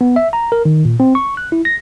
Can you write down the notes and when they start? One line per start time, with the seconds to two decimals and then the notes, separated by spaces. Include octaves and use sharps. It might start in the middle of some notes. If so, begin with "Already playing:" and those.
0.01 B3
0.16 E5
0.33 A#5
0.52 A#4
0.65 D#3
0.85 A#2
1.00 C4
1.15 C#6
1.37 F#6
1.52 E4
1.65 A#6